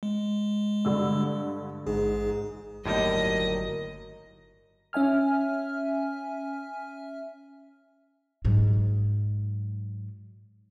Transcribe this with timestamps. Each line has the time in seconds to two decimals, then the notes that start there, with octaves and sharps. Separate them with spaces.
0.03 G#3
0.85 G2 D3 E6
1.86 A1 G#2 G#4
2.85 G1 D#2 A2 F#3 G3 A#4 D#5
4.93 C#4 E5 G#5 F6
8.45 G#2 F#3